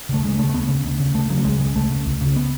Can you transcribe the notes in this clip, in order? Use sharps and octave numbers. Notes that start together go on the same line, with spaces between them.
D2 C#3 A3
D2 G#3
C#3 A3
A3
D2 B3
C#3
D2
C#3
D2 A3
C#3 F#3
C#2 G#3
C#3 G#3
C#2 A3
C#3
C#2
C#3
B3